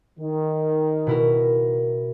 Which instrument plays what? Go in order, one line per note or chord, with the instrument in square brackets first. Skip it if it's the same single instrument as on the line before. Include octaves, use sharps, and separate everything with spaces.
[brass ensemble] D#3
[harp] B2 E4 A#4